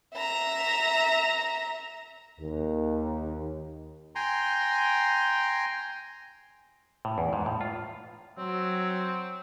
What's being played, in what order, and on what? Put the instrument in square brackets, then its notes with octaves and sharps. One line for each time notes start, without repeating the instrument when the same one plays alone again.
[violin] E5 A#5
[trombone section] D#2
[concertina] G5 G#5 A#5 C6
[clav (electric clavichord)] A2
E2
G#2
A2
F4
[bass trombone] F#3 [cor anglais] C4